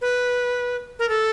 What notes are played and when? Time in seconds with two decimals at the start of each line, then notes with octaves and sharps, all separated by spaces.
0.01 B4
0.99 A#4
1.09 A4